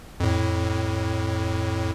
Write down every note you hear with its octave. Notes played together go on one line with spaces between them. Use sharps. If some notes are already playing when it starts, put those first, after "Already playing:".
F2 A2